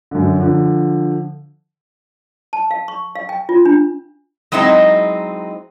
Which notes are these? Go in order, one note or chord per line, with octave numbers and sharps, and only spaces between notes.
F#2 D3
D3 F3
A5
F5
C#6
F5
G5
F4
D4
F#3 G#3 C4 D#4 E4